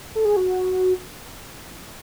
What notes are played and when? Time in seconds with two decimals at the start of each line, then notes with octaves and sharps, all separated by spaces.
0.15 A4
0.25 G#4
0.36 F#4